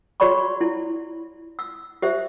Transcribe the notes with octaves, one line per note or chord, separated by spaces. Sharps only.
F#4 G#4 C#5 D5 B5 C#6
E4
E6
G4 C5 E5